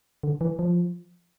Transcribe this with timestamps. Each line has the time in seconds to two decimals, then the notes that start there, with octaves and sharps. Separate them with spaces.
0.23 D3
0.41 E3
0.59 F3